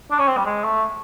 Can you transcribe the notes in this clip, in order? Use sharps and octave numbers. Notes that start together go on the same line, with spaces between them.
D4
C#4
C4
G3
G#3
A3